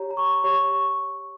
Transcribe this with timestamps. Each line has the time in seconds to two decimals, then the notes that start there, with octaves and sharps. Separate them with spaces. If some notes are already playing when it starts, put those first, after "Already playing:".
Already playing: G4 C#5 A#5
0.11 A#5
0.17 C#6
0.44 G4 C#5 C#6
0.71 C#6